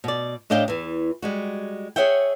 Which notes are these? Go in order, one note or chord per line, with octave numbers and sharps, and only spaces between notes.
B2 D5
A2 D4 D#5 F5 G5
E2 E3
G3 G#3 F#4
G#4 A4 C#5 E5 F#5 G5